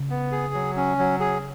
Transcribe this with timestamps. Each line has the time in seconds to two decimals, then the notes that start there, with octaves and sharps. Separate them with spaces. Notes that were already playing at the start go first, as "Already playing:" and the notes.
Already playing: C#3
0.10 B3
0.32 G#4
0.54 F#3
0.76 C#4
0.99 F#3
1.20 G#4